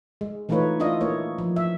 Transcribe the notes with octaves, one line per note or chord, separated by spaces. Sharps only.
G#3
E3 A3 D#4 F4 B4 C#5
D4 E4 F4 D#5
A#3 C#5
F3
E5